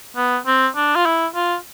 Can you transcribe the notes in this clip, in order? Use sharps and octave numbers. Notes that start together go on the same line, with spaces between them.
B3
C4
D4
F4
E4
F4